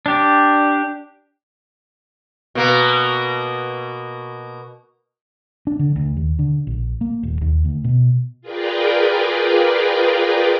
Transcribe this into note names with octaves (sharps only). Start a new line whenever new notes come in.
D4 G4
B2 A#3
D4
D3
D2
D#2
D3
A#1
A#3
D#1
D#2
D2
B2
F4 G#4 A#4 B4 D5 G5